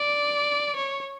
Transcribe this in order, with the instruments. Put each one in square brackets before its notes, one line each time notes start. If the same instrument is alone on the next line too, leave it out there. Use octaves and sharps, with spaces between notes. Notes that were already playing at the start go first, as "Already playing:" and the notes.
Already playing: [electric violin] D5
C#5